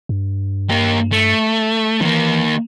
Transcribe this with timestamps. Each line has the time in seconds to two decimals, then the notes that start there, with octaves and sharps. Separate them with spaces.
0.09 G2
0.70 A#3 G4
1.12 A3
2.01 D#3 E3 A#3